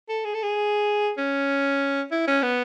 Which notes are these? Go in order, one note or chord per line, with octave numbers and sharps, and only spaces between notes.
A4
G#4
A4
G#4
C#4
E4
C#4
B3